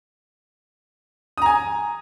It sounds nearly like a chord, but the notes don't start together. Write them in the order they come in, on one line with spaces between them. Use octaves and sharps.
D#6 A#5 G#5